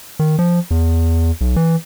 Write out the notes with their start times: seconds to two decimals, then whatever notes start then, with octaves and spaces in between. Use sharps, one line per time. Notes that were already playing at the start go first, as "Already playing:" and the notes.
0.19 D#3
0.39 F3
0.71 E2
1.41 B1
1.56 E3